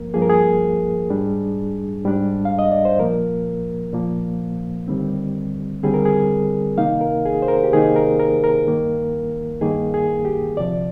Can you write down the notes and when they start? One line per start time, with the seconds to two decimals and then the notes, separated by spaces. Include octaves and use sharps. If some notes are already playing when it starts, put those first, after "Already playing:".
Already playing: G2 F3 A#3 A#4
0.14 G2 F3 A#3 G#4
0.22 A#4
0.30 G#4
1.09 G#2 G3 D4
2.04 G#2 G3 D4
2.45 F5
2.59 D#5
2.71 D5
2.85 C5
2.99 A#2 F3 A#3 A#4
3.93 A#2 F3 A#3
4.88 D#2 D3 G3 C4
5.83 D#2 D3 G3 C4 G#4
5.94 A#4
6.05 G#4
6.78 C3 D#3 A#3 D#4 F5
7.01 A#4
7.25 G#4
7.42 C5
7.48 A#4
7.63 G4
7.72 C3 D#3 A#3 D#4 G#4
7.96 A#4
8.19 A#4
8.44 A#4
8.67 G2 D#3 A#3
9.61 G2 D#3 A#3 G#4
9.94 G#4
10.25 G4
10.56 D2 C3 F3 D5